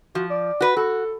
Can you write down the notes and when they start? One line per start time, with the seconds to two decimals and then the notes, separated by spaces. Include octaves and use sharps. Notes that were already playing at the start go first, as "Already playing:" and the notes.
0.15 F3 F#4
0.30 D5
0.61 F#4 B4
0.77 F#4 A4